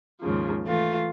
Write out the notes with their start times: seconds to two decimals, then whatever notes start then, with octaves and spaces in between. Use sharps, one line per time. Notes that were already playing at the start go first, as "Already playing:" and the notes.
0.22 D#2 G#2 C#3 F3
0.64 E3 A3 F4